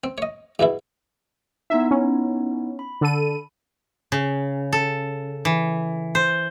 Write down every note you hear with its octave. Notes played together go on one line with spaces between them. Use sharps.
C4
C#5 D#5
E2 B2 E3 E4
B3 D#4 E4 E5
C#4
B5
D3 A4 D#7
C#3
A4
E3
C5